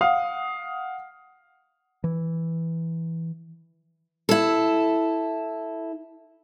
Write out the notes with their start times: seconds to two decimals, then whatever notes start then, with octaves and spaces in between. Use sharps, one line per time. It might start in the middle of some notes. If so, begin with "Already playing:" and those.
0.01 F5 F#5 D#6
2.04 E3
4.29 E4 A4